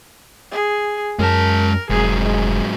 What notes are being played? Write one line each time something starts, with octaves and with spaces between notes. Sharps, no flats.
G#4
F#2 G#3 A#4 A5
F1 G#2 F#3 G#4
G#3